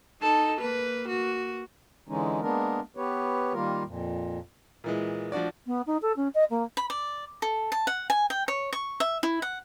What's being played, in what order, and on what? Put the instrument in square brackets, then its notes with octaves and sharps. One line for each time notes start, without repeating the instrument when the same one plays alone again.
[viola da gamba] D#4 [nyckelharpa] A4 A5
[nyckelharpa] A#3 [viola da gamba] B4
[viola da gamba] F#4
[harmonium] D3 E3 G#3 C#4 D#4
G#3 A#3 B3 D4 A#4
B3 G4 B4 C#5
D#3 G3 A#3 F4 A#4
F2 A#2
[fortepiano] A#2 E3 G#3
F3 D4 F#4 D5
[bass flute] B3
D#4
A4
C#4
D#5
A#3
[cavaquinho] B5
D5
A4
A5
F#5
G#5
G5
C#5
C#6
E5
E4
F#5